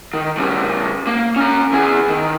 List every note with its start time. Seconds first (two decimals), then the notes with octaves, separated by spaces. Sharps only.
0.13 D#3
0.37 C#3 G3
1.07 A#3
1.36 C#4 A#5
1.72 E2 G#4
2.08 D#3